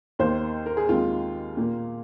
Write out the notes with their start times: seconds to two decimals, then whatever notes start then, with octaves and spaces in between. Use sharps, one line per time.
0.19 D#2 D#3 A#3 C5
0.66 A#4
0.77 G#4
0.89 D#2 D#3 G#3 C4 F4
1.57 A#2 A#3